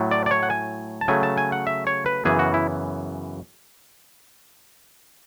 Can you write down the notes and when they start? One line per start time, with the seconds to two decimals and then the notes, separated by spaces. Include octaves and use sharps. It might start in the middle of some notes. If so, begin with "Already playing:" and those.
Already playing: A2 F#3 A3
0.11 D5
0.26 D5
0.31 C#5
0.43 F#5
0.50 G#5
1.01 A5
1.08 C#3 F#3 A3 G#5
1.23 A5
1.38 G#5
1.52 F#5
1.67 E5
1.87 C#5
2.06 B4
2.25 F#2 C#3 E3 B3 G#4
2.39 F#4
2.54 E4